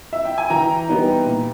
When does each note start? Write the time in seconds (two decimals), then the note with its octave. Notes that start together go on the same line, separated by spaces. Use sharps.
0.13 E5
0.25 G5
0.38 G#5
0.50 E3 G5 A#5
0.88 G3 B3 D#4
1.25 A#2